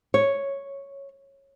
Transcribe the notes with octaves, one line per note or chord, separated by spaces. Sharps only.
C#5